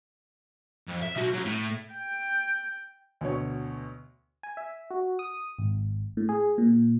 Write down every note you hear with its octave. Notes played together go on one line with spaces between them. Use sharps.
F2
E5
B1 F#4
F#3 C#4
A2
G5
D2 B2 C#5
G#5
E5
F#4
D#6
G#1
A2
G#4
A#2